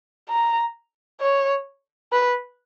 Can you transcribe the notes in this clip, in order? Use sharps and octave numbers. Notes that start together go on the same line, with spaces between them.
A#5
C#5
B4